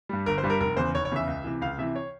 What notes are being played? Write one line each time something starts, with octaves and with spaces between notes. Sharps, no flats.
G2 G3
G1 A#4
C5
G2 G3
A#4
F1 A#4
E2 C#3 C5
F1 C#5
C#5
E2 C#3 E5
C#2
C3 E3
C#2 F5
C3 E3 E5
C#5